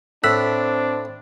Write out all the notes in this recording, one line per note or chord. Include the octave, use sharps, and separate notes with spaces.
A2 C4 D4 E6 F#6 B6